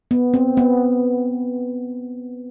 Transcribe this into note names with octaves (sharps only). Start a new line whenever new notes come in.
B3
C4
B3